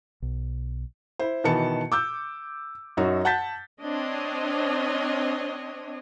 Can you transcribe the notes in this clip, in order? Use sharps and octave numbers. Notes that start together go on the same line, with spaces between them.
B1
E4 C5
B2 D#3 E3 B3 A5 C#7
D6 E6 G6
F#2 D#4 F#4 C#5
F#5 A5 G6 A6 B6
C4 D4 C#5 D#5